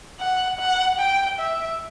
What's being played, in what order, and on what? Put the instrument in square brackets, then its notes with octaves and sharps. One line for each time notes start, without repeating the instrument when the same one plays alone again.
[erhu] F#5
F#5
G5
E5